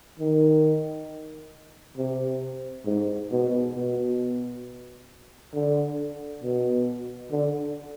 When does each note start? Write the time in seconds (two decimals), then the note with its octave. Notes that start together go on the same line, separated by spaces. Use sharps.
0.19 D#3
1.97 C3
2.86 G#2
3.31 B2
3.75 B2
5.54 D3
6.43 B2
7.31 D3